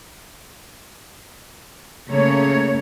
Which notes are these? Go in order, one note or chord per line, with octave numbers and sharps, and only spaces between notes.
C#3 A3 A#3 C#5